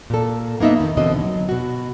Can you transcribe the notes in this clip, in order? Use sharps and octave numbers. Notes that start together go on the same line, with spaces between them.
A#2 A4
A#3 B3 D#4 D#5 E5
F2 D#3
E2 B2 D3 C4 D#5
F#3
B2 F#4